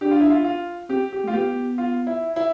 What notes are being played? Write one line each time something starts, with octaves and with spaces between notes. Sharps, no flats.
D4 G4
F4
E4
F4
F4
C4 G4
G4
A3 F4
B3 G4
F4
E4
E4